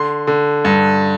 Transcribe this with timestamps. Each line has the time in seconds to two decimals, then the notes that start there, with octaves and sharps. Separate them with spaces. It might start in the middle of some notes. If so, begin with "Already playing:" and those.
Already playing: D3 C6
0.27 D3
0.65 G2